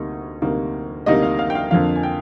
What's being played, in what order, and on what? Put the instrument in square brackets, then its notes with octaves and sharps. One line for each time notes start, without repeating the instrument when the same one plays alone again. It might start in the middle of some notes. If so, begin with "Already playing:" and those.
Already playing: [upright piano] D2 C3 G3 A#3 D#4
D2 C3 G3 A#3 D#4
D2 C3 G3 A#3 D#4 D#5
F5
F5
G5
F5
F2 D3 F3 A#3 F5
G#5
G5